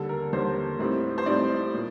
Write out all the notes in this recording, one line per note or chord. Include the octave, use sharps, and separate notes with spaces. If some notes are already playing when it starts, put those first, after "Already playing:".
Already playing: D#2 D3 G3 A4
A#4
D#2 D3 G3 C5
A2 G3 C4 D#4
C5
A2 G3 C4 D#4 D5
A#2